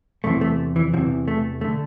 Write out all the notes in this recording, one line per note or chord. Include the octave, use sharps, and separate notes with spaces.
E2 C3 E3 A3
A3
E3
E2 C3 E3 F3
A3
D3 A3